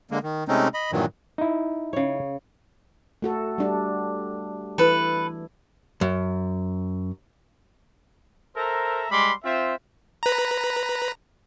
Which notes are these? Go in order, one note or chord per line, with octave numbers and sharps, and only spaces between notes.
D3 G#3 A#3
D#3
C3 G#3 A3 C4 C#4 D#4
D#5 B5
G2 A#2 D#3 E3 F#3
D#4 E4
C#3 C#5
A3 F#4 A4
G3 D4
E3 E4 A4 B4
F#2
A4 A#4 C5 E5 A#5
G3 G#3 B5 C6 D6
C4 F4 C5 E5
B4 A#5